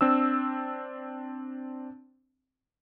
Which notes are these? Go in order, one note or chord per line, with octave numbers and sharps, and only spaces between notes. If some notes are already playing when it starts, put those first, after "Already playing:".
C4 D4 E6